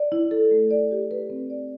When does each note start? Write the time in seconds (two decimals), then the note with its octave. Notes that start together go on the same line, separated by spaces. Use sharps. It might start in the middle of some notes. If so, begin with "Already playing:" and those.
Already playing: D5
0.12 E4
0.31 A4
0.51 A3
0.71 D5
0.91 G4
1.11 B4
1.30 C4
1.50 D5